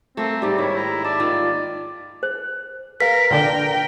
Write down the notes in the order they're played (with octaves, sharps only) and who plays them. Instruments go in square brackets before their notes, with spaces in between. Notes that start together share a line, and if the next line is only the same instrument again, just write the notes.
[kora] A3 A#3 [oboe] C4 [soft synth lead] E5
[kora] G#2 G3 [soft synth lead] G4 [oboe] D5
[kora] D#3 [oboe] E4 [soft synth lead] C#5
[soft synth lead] A#5
[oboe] D5 [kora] E5 [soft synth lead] A5
[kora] D#3 [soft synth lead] F4
[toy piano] C5
[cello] A#4 [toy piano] B4 F5 [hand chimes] B6
[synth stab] A#2 D3 D4 [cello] A#4 G5